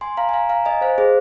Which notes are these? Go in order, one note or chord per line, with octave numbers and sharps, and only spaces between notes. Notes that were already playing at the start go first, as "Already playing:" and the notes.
G#5 C6
F5 A#5
G#5
F5 A#5
F5 A#5
D#5 G#5
C5 F5
G#4 C5